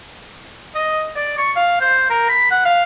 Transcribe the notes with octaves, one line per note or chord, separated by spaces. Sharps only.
D#5
D5
C#6
F5
C5
A#4
B5
F#5
F5